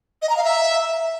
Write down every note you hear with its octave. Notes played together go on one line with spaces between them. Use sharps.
D#5
A#5
F5
E5